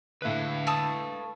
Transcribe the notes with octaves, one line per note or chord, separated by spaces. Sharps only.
A2 D3 B4 E5 F5 F#6
A3 A5 D#6